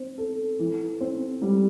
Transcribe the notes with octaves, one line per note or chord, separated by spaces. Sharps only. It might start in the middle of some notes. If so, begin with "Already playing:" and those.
Already playing: C4
A4
E3
C4
G3